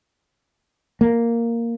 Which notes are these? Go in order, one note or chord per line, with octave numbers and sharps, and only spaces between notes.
A#3